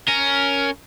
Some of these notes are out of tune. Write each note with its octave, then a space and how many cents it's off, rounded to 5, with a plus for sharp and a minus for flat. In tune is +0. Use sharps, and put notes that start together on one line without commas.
C#4 +10 A#4 +0